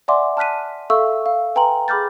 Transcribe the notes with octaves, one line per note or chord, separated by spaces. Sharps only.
D5 E5 F#5 G#5 C6 D6
A5 F6 F#6 B6 D#7
A4 E5 F5 C#6 E6
F5
B4 G5 G#5 A#5 C6 F#7
G#4 B5 D6 F6 G6 A6